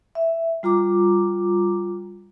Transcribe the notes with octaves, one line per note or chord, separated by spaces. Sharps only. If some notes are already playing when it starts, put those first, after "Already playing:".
E5
G3 F4 A#5 D6